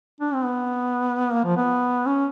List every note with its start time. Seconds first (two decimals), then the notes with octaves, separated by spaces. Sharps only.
0.21 D4
0.34 C4
0.45 B3
1.32 A#3
1.44 F3
1.57 B3
2.06 C#4